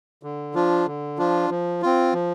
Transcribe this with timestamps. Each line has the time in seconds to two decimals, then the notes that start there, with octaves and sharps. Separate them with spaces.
0.23 D3
0.54 F3 D4 F4
0.87 D3
1.18 F3 D4 F4
1.50 F3
1.82 C4 F4
2.13 F3